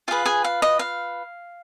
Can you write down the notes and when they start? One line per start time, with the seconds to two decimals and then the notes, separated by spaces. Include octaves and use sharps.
0.08 F4 G#4 B4 F5
0.25 G#4 G#5
0.44 F5
0.62 D#5
0.79 F5